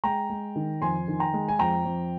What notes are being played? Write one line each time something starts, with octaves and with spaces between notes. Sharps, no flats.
G#3 G5 A#5
G#3
D#3
F2 G#5 C6
D#3
G5 A#5
G#3
G#5
F2 G5 A#5
F2